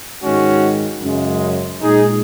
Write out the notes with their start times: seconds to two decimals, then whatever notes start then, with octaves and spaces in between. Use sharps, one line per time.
0.22 G#2 D#3 G#3 C#4 F#4
1.02 F#2 C#3 G#3
1.81 A#2 G#3 D#4 G#4